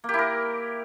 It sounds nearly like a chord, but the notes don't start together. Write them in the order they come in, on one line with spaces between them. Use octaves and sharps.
A#3 G4 E4 A#4